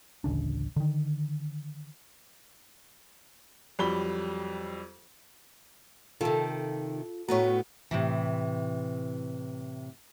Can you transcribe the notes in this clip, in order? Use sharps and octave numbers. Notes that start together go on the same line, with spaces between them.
A1 D2 C#3 D4
D3 D#3
F2 F#3 G3 B5 G7
C3 D#3 F4 A4
A2 A3 B3 F#4 C#5 A#5
A2 C3 E3